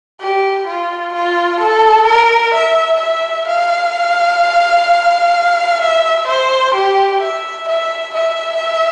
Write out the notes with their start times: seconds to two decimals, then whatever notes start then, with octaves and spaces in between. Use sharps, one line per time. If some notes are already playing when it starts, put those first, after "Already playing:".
0.21 G4
0.67 F4
1.13 F4
1.60 A4
2.07 A#4
2.54 E5
3.00 E5
3.48 F5
5.82 E5
6.28 C5
6.75 G4
7.22 E5
7.69 E5
8.15 E5